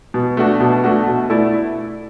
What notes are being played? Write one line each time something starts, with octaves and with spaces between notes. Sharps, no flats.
B2
A3 D4 F#4
B2
A3 D4 F#4
B2
A3 E4 A4 D5